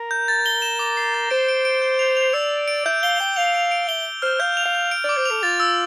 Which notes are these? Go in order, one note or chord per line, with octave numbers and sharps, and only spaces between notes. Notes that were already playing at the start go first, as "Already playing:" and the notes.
Already playing: A#4
G6
A6
G7
E7
D6
C7
A6
C5 D7
D7
D7
G6
F7
F7
D5 E6
F7
D7
E5 G6
F5 G7
G5 G6
F5 F7
D7
D7
E5 G7
G7
C5 F6
F5 G6
F7
F5
G6
D7
D5
D6
C5
A4 F7
F4 A6
E6